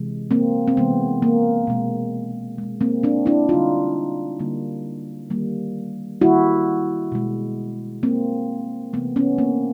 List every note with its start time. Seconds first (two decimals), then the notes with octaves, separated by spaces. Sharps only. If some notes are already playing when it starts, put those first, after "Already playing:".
Already playing: C3 E3 G#3
0.31 A#3 C4
0.68 C4
0.77 C3 E3 G#3 B3
1.22 A#3
1.67 B2 G#3
2.58 B2 G#3
2.81 A#3 C4
3.03 C4 D4
3.26 D4 E4
3.49 D3 G3 A#3 D#4 F4
4.39 D3 G3 A#3
5.30 D#3 G3 A#3
6.21 D#3 G3 A#3 E4 F#4
7.12 B2 G#3
8.03 B2 G#3 A#3 C4
8.93 C3 E3 A3 B3
9.16 B3 C#4
9.38 A#3 C4